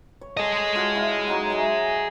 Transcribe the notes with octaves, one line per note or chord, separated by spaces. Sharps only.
C#5
G#4 A4 D#5
F4 F#4
E4 F4
F#3 D#4 F#4
E5 G#5